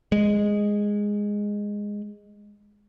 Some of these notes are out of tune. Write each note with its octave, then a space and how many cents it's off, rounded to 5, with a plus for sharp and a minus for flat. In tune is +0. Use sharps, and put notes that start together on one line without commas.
G#3 -10